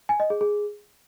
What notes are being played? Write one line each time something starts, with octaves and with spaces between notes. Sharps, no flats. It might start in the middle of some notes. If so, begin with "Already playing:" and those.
G#5
D#5
G#4
G#4